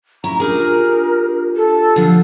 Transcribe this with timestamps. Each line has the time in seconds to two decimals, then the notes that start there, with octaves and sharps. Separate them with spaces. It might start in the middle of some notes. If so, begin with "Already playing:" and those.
0.24 C#4 E4 A#5
0.40 D4 F4 G4 G#4 A#4
1.56 A4
1.96 D3 F3